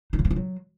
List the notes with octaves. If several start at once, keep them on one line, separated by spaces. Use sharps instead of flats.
D#4
C#3
B3
F3
F#3